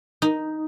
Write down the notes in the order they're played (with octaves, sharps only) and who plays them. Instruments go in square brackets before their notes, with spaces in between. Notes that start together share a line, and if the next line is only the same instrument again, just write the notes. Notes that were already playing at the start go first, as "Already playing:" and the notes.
[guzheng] D#4